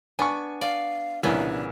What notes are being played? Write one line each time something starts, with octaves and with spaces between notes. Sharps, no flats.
B3 D4 G#5 C#6
D5 F5
C2 A#2 C#3 E3 B3 D4